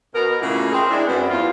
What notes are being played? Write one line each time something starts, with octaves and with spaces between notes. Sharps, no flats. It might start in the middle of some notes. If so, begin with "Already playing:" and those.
B2 A#4
A2 C#3 G#3 A#3 E4 F4
C4 G#4 A#4
G#3 D4 E4
F#2 B3 C4
E2 F4